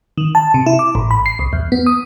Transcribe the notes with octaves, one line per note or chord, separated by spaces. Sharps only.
D#3
A5
C3
E4
D6
A1
B5
C7
C2
E2
B3
D#6